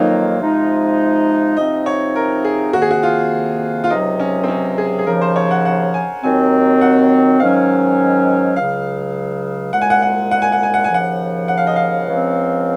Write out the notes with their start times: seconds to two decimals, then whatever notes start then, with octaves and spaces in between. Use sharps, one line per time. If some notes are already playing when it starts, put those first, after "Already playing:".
Already playing: F2 D#3 F#3 A#3 D#4 F4
0.40 C3 F3 G#3 D#4
1.57 C3 F3 C4 D#4 D#5
1.86 C#5
2.16 A#4
2.45 G#4
2.73 F2 C3 D#3 A#3 F#4
2.82 G#4
2.91 F#4
3.03 F4
3.84 F4
3.90 C#2 C3 F#3 D#4
4.20 C#4
4.44 C4
4.48 C#4
4.78 G#4
4.99 G#4
5.06 D#2 C#3 F3 A#4
5.21 C5
5.36 C#5
5.51 F#5
5.65 F#5
5.94 G#5
6.23 D#2 D#3 F#3 C4 G#5
6.81 F#5
7.40 G#2 D#3 F#3 C#4 F5
8.56 C#2 C#3 F#3 F5
9.73 C2 A#2 G#3 F#5
9.82 G#5
9.90 F#5
10.02 F#5
10.31 F#5
10.42 G#5
10.52 F#5
10.63 G#5
10.74 F#5
10.84 G#5
10.89 D#2 C#3 F3 F#5
11.48 F#5
11.58 F5
11.67 D#5
11.76 F5
12.06 C#2 C#3 F3 C4